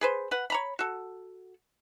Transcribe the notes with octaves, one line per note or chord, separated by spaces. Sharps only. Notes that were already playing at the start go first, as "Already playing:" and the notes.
G#4 B4 C5
B4 F#5
C#5 A#5 B5
F#4 A4